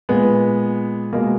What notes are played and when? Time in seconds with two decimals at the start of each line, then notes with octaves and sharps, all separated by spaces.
0.09 A#2 G#3 B3
1.13 B2 G#3 A#3